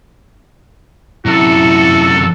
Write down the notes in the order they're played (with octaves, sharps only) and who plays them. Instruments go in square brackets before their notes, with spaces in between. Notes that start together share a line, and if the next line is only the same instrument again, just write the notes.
[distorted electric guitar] F#2 C3 [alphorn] E4 [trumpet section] F#4 A4